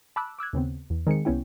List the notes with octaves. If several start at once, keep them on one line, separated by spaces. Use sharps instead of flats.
A5 B5 D6 E6 F#6
D6 E6 F#6 G#6
D#2 C#3 B3 C4
E2
D#3 G#3 C4 C#7
C2 B3 C#4 E4 G5